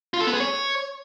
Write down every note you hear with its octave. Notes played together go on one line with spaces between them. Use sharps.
F4
A4
B3
G#4
C#5